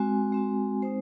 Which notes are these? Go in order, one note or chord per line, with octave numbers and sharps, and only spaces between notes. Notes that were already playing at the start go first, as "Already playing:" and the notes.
Already playing: G#3 C4 F#4 G#5
G#3 C4 F#4
G#3 C4 D#4 C5